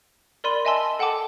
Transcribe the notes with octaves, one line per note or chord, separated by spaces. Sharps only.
A#4 D5 B5 C6 D#7
D#5 E5 G#5 A5 C6 E6
A4 F#5 G5 A5 D6